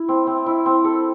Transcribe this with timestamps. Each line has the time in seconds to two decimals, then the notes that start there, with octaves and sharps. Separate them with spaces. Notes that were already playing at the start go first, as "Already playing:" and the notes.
Already playing: E4
0.09 C4
0.27 C4
0.46 E4
0.66 C4
0.84 A4